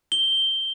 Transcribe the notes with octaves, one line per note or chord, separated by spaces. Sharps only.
G7